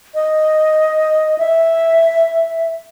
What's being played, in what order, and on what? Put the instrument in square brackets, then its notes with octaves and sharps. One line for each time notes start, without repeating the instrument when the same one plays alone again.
[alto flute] D#5
E5